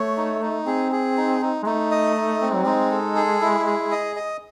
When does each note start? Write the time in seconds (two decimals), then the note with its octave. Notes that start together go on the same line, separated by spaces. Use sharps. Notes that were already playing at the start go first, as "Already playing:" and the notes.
Already playing: A3 C#5
0.17 D#4
0.42 D#4
0.66 C4 G#4
0.92 G#4
1.17 D#4
1.42 D#4
1.63 G#3
1.66 A3 D#4
1.91 D#5
2.16 D#4
2.41 C4
2.54 F#3
2.66 G#3 D#4
2.91 A4
3.16 G#4
3.41 E4
3.66 G#4
3.91 D#5
4.16 D#5